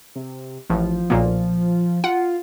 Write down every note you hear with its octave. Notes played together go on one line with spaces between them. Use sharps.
C3
A1 F3
B1 A#2 A#3
F4 F#5